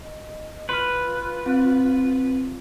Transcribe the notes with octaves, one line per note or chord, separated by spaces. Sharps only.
D#5
F4 B4 C6 F6
C4